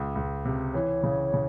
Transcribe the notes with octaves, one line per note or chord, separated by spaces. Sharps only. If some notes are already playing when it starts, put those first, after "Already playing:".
Already playing: C#2
C#2
C3
E3 C#5
C#3
C#3